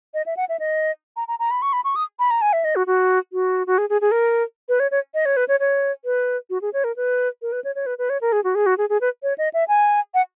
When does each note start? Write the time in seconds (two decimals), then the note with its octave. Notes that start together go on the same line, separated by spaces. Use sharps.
0.14 D#5
0.26 E5
0.37 F#5
0.49 E5
0.60 D#5
1.17 A#5
1.28 A#5
1.39 A#5
1.51 B5
1.62 C#6
1.73 B5
1.84 C#6
1.96 D#6
2.19 B5
2.31 A#5
2.42 G#5
2.53 E5
2.64 D#5
2.76 F#4
2.87 F#4
3.33 F#4
3.67 F#4
3.78 G#4
3.90 G#4
4.01 G#4
4.12 A#4
4.69 B4
4.80 C#5
4.91 C#5
5.14 D#5
5.26 C#5
5.37 B4
5.48 C#5
5.60 C#5
6.05 B4
6.50 F#4
6.62 G#4
6.73 C#5
6.84 A#4
6.96 B4
7.42 A#4
7.52 B4
7.64 C#5
7.75 C#5
7.86 B4
7.98 B4
8.10 C#5
8.21 A#4
8.32 G#4
8.44 F#4
8.55 G#4
8.66 F#4
8.78 G#4
8.89 G#4
9.01 B4
9.23 C#5
9.38 D#5
9.54 E5
9.68 G#5
10.14 F#5